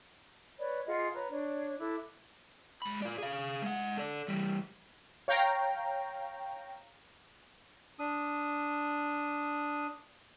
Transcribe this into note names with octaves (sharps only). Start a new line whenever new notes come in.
B4 C#5 D5 B5
F4 G#4 D#5 F#5
B4 C#5 A#5
D4 C#5 D5
E4 A4 D6 F#6
G#3 B5
F4 D5
G#4 F5
G#3 F#5
A4 D5
E3 G3
C#5 F5 G5 A#5
D4 D#6